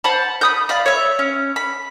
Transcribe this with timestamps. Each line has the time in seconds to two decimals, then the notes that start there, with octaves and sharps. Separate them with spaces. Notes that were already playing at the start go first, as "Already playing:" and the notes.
0.04 C5 F#5 A5 B5
0.41 B5 D#6 G6
0.69 D5 F5 B5
0.86 C#5 E5
1.19 C#4
1.56 B5